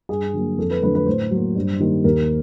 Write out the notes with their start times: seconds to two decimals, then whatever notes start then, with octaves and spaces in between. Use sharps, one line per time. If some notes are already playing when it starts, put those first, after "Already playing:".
0.09 G2 G#4
0.33 D3 F#3 A#3
0.58 F2 A4
0.70 B4
0.82 D3 F#3 A3 B4
0.95 B4
1.06 A2 C5
1.31 F#3 A#3
1.56 G2
1.80 D#3 G3 A#3
2.04 D#2 A#4